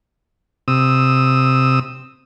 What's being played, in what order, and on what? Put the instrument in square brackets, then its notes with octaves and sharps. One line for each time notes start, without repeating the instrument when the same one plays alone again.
[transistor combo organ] C3 D#6 E6